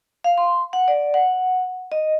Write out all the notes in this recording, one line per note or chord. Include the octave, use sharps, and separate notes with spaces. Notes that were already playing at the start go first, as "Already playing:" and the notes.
F5
C6
F#5
D5
F#5
D#5